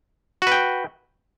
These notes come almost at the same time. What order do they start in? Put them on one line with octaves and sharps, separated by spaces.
F#4 B4 G5